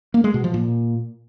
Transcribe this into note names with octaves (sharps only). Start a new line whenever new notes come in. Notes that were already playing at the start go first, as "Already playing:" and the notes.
A#3
G#3
B2
F3
A#2